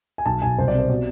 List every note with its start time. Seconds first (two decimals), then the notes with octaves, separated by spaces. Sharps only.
0.18 G#5
0.26 B1 A5
0.42 B1 G#5
0.58 C2 C5
0.68 D5
0.74 C3
0.79 C5
0.89 B2 D5